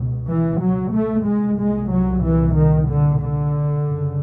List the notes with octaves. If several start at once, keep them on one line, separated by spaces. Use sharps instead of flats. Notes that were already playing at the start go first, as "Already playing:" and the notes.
Already playing: C#2 B2
E3
F#3
A3
C2 A#2 G#3
G#3
F#3
E3
D#3
D3
D3
F#2 C#3